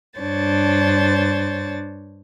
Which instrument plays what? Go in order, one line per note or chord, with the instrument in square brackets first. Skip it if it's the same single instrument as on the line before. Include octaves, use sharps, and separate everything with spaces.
[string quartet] G2 D4 C5 C#5 A6